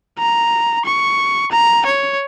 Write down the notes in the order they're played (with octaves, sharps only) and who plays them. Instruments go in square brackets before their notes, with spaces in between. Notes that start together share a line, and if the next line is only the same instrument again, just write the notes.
[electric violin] A#5
C#6
A#5
C#5